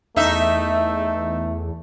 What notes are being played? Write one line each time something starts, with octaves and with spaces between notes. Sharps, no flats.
E2 A3 D#4 E5